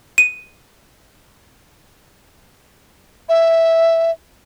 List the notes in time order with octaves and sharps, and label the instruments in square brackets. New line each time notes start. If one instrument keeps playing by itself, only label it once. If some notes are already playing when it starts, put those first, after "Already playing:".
[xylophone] D#7
[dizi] E5